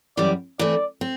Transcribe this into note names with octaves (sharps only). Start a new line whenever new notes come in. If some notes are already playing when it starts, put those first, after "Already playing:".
F#2 E3 G3 D5
E3 A3 C4 D5
C4